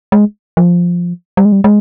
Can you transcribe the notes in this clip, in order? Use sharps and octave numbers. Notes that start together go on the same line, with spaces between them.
G#3
F3
G3
G#3
G3
G#3